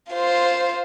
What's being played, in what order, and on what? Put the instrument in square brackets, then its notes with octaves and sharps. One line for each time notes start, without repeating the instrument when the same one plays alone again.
[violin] F4 C5